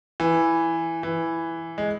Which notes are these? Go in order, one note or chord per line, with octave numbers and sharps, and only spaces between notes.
E3
E3
G#3